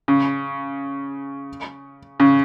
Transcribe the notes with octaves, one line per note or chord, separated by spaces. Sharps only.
C#3
C#3